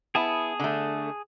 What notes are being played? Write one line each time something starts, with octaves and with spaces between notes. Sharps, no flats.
B3 E4 G#4 A5 D#6
D3 A3